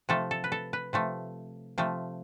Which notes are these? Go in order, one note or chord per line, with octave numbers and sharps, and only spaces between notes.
C3 F3 A3 A4
A4
B4
A4
B4
C3 F3 A3
C3 F3 A3